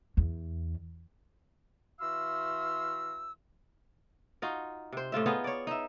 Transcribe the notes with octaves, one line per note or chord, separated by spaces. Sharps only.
E2
E3 F#4 E5 F5 C6 E6
D#4 F4 F#4
C3 C5
A2 A3 F4 E5
B3 D#4 F4 G#4
C#5 D5
D#4 E5